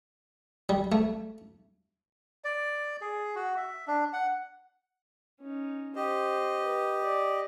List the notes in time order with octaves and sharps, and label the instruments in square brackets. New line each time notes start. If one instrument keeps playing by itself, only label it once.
[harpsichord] G3
A3
[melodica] D5
G#4
F#4
E5
D4
F#5
[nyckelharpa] C#4 D#4
[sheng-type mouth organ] G4 D#5 [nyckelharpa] C5
[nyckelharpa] B4
D5